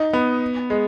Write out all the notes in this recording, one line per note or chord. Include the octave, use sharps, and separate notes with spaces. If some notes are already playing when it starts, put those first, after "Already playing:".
Already playing: D#4
B3
G#3